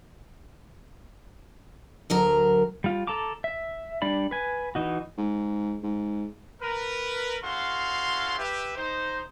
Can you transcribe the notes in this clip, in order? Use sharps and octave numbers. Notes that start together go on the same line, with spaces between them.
D2 F#3 A#4
G3 F4
A4 A5 A#5 D6
E5
G3 D4 D5 B5
B4 G#5
E3 D#4 F#4
G#2
G#2
A#4 B4
C#4 E4 F#4 A4 F5 C6
G4 B4 E5
D#4 C5